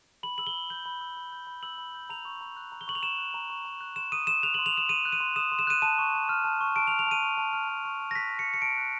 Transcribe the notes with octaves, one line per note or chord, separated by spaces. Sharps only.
B5 F#7
E6 F#7
G7
B5
G6 F#7
B5
E6
B5
G6
B5
E6 F#7
B5
G6
A#5 F7
C#6
A#5
F#6
A#5
G7
C#6 F#7
F7
A#5 E7
F#6
A#5
C#6
A#5
F#6
C6 E7
D#6 D#7
C6 E7
F#6 F7
C6 F#7
F7
D#6 E7
C6 D#7
F#6
D#7
C6
D#6 E7
C6
E7
F#6 D#7
A5 D#7
C#6
A5
F6
A5
C#6
A5 D7
F7
F6
F7
A5 D#7
C#6
A5
F6
A5
C#6
A5
A#6
F#6 B6
A5
C#7
C#6
C#7
A5 D7
F#6